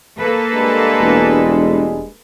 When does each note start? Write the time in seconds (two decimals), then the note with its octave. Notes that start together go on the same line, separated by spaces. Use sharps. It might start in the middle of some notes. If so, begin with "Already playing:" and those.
0.17 A#3 A4 B4
0.52 G2 G#3
1.01 E1